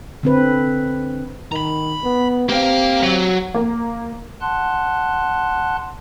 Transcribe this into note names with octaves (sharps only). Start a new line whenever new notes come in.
D3 C4 B4
D#3 A#5 B5
B3
A#3 C4 G4 F5
F#3
A#3
F#5 A5 C6 F#6